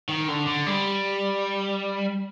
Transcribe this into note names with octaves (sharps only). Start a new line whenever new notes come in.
D#3
D3
D3
G3